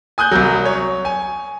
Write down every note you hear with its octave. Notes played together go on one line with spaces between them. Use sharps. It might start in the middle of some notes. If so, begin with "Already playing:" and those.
G#5 D#6 F#6 G6
C2 F#3
C#5
G#5